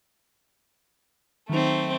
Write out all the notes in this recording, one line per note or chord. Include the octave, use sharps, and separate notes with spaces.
D#3 F#3 A3 C4 D#4